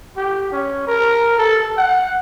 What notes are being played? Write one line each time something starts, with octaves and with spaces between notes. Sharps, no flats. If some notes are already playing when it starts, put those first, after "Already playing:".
G4
C#4
A#4
A4
F#5